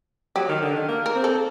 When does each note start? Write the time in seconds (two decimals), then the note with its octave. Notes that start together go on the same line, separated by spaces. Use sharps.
0.36 F#3 G4
0.49 D#3
0.62 D3
0.75 D#3
0.88 A#3
1.06 A#4
1.15 C4
1.24 A4